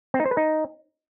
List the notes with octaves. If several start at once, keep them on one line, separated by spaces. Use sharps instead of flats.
C4
D#4
C5
B4
D#4